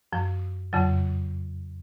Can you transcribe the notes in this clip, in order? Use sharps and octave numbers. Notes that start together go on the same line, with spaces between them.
F#2 F3
F2 C#3 F#3